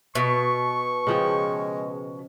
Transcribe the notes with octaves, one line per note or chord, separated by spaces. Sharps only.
B2 C#6
C#3 F3 G#3 G5